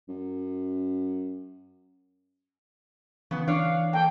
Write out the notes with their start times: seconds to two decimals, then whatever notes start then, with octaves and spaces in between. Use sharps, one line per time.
0.09 F#2
3.31 C#3 E3 B3
3.48 E3 D4 C#5 F5
3.93 A#3 A4 G5